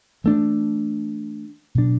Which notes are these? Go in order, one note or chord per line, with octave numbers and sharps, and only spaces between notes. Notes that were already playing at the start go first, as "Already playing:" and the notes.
E3 A3 D4
B2 F#3 D4